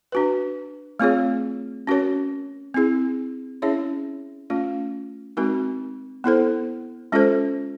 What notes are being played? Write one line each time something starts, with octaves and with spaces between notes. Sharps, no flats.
D4 F#4 B4
A3 C4 F4 G#4 C#5
C#4 F#4 A#4 C#5
C4 E4 G#4
C#4 E4 G#4 C#5 E5
A3 C#4 F4
G#3 C4 D#4 F#4 A#4
B3 E4 A4 C5
G#3 C#4 F4 A4 C5